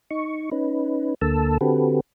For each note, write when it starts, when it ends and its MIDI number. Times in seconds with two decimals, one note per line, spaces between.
0.11 0.50 63
0.11 0.50 85
0.52 1.14 61
0.52 1.14 63
0.52 1.14 71
1.21 1.58 38
1.21 1.58 50
1.21 1.58 58
1.21 1.58 69
1.21 1.58 81
1.21 1.58 88
1.61 2.00 50
1.61 2.00 60
1.61 2.00 66
1.61 2.00 67
1.61 2.00 69
1.61 2.00 71